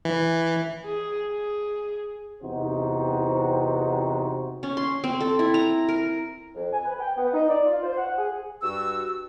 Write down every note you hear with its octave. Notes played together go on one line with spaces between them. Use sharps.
E3
G#4
G#4
E2 C3 C4 D#4 F#4 C5
C#4
C6
C4
A4
E4
A#5
A#4
F2
G#5
B4
G5
B3
D#4
D5
F4
C5
F#5
G#4
G2 F#4 E6